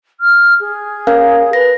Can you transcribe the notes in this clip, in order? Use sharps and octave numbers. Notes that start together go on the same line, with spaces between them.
F6
G#4
C#4 A#4 F5
B4 A#6